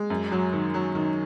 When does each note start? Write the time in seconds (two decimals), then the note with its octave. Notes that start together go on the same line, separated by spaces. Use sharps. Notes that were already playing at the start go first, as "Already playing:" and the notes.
Already playing: G#3
0.10 F#2
0.32 F#3
0.53 D#3
0.74 F#3
0.95 D#3